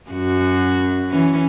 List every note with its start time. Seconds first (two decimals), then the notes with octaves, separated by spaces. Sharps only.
0.10 F#2 F#4
1.10 E3 C#4